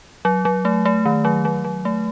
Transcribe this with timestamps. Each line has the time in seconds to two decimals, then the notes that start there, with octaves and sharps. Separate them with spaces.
0.25 F#3
0.45 F#3
0.65 A3
0.85 A3
1.05 D#3
1.25 F#3
1.45 F#3
1.64 F#3
1.85 A3